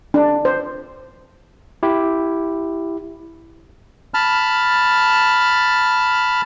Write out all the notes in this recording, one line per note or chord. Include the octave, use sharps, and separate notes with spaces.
D4
C5
E4 G4
A5 B5 F6